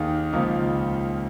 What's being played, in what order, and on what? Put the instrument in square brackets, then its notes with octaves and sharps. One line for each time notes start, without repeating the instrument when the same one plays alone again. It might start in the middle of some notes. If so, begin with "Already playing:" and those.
Already playing: [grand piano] D#2 D#3 A#3 D#4 G#4
C#2 C#3 F3 A#3 D#4